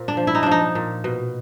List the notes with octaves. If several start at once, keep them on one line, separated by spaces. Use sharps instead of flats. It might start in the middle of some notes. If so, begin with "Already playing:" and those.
Already playing: A#2 C4
D4
F3
E4
D#4
F3 D4
D#4
A#2
B2